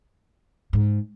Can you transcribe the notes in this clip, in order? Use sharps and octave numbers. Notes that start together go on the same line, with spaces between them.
G#2